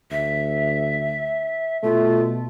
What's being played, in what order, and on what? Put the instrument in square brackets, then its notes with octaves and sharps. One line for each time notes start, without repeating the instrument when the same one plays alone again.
[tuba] D2 [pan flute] E5
[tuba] B2 [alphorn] A3 [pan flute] F4